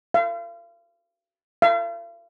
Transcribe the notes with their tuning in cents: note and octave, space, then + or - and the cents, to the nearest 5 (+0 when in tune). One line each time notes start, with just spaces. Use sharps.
F5 -40
F5 -45